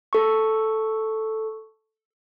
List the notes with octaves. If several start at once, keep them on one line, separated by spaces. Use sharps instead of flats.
A4 C#6